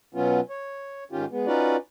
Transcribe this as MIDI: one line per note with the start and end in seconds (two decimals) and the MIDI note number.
0.14 0.40 47
0.14 0.40 54
0.14 0.40 59
0.14 0.40 61
0.14 0.40 65
0.50 1.04 73
1.12 1.25 44
1.12 1.25 51
1.12 1.25 61
1.12 1.25 65
1.12 1.25 67
1.31 1.46 56
1.31 1.46 59
1.46 1.76 61
1.46 1.76 63
1.46 1.76 65
1.46 1.76 66
1.46 1.76 71
1.46 1.76 74